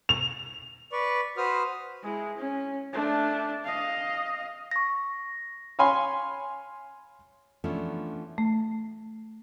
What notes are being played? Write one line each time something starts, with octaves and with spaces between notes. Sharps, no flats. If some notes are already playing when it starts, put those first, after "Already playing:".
F7
B4 D5 C#6
F#4 B4 C5 D#6 F6
G#3 E4
C#4
A3 D4
D#5 F5
C#6 A#6
C#5 F5 G#5 B5 C6
E3 F3 A3 B3 C#4 D4
A3